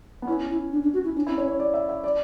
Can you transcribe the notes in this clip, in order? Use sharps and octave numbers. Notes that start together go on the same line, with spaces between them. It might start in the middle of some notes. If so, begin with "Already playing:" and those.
B3
C#4 E4
E4
D4
D4
F#4
E4
C#4 D4
C#4 E4
C#4 C#5
C#5
D5
E5
E5
D5